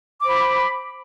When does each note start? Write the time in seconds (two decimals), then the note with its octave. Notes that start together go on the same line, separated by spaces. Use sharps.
0.22 D6
0.25 C5
0.29 B5